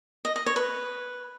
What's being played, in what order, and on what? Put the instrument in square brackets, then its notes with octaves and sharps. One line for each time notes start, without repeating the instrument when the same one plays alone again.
[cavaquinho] D#5
D#5
C#5
B4